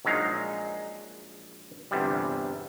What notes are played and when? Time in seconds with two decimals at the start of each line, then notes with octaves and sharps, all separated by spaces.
0.05 A#1 F#3 G#3 D#4 F5
1.91 G1 E2 C3 G3